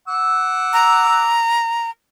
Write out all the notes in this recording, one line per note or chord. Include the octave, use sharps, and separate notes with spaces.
F#5 D6 E6
A#5